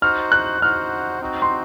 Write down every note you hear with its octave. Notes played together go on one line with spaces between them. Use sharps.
D#4 F#4 C5 F#5 F6
F#6
D#4 F#4 C5 F#5 F6
C4 D#4 F#4
C6